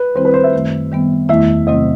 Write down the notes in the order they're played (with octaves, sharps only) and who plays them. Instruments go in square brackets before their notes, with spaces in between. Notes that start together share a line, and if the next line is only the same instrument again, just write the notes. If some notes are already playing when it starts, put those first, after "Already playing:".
Already playing: [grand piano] B4
[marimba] D#3 G3 C4 E4 [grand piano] C5
[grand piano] B4
C5
E5
[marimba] F#2 D#3 A3
D#3 G3 B3
[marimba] E2 D#3 A3 E4 [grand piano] E5
[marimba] E2 C3 F#3 A3 C4 [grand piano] D#5